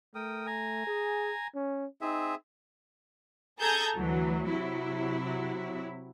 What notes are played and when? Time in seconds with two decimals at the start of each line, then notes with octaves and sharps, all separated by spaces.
0.15 A3 A#4 G5 D#6
0.47 G#5 A#5
0.87 G#4
1.55 C#4
2.01 C4 D#4 G#4 E5
3.60 G#4 A4 A5 A#5 G6 G#6
3.96 D2 E3 F#3
4.48 C3 F#3 E4